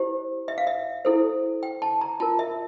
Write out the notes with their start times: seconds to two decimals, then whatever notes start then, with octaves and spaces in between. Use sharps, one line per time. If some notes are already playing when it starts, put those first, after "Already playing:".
Already playing: E4 G4 C5
0.48 E5
0.58 F5
0.67 E5
1.05 E4 A4 C5
1.63 G5
1.82 A5
2.01 A#5
2.20 F4 A#4 A5
2.39 E5